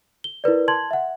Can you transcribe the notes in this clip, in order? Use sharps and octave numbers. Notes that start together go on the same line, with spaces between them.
G7
E4 A#4 B4 D5
A5 C6 G#6 F#7
E5 F#5